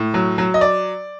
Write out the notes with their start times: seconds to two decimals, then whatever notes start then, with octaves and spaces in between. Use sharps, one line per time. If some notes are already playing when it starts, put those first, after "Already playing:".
Already playing: A2
0.14 F#3
0.38 F#3
0.54 D#5
0.61 D5